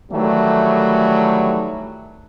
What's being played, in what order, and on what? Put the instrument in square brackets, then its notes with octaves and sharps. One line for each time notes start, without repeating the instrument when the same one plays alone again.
[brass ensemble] D#3 E3 F#3 G3 A3